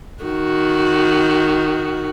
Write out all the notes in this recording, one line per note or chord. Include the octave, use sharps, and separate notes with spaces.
D#3 F#4